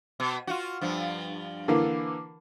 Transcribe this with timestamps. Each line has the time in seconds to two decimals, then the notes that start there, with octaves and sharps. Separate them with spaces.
0.20 B2
0.47 F4 F#4
0.81 G2 F3
1.68 D3 E3 A#3